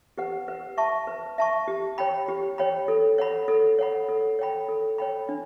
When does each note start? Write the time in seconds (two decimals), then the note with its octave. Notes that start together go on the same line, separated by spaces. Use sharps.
0.18 G4 B4 F#5
0.48 B4
0.77 E5 A5 C#6
1.07 B4
1.38 E5 A5 C#6
1.68 G4
1.98 C#5 G5 B5
2.28 G4
2.58 C#5 G5 B5
2.88 A4
3.18 C#5 F#5 B5
3.48 A4
3.79 C#5 F#5 B5
4.09 A4
4.39 C#5 G5 B5
4.69 A4
4.98 C#5 G5 B5
5.29 D4